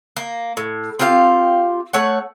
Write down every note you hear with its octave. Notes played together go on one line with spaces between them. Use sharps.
A#3
A2
C4 F4 G4 F5
A3 C#5 F#5